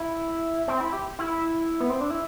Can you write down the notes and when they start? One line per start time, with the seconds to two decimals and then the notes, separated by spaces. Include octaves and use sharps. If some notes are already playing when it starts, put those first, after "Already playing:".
Already playing: E4
0.68 C4
0.81 E4
0.93 G4
1.19 E4
1.80 B3
1.90 C4
2.01 D4
2.10 E4